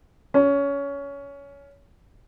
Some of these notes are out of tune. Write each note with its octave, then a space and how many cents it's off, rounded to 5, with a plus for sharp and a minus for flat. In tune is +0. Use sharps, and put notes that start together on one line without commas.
C#4 +20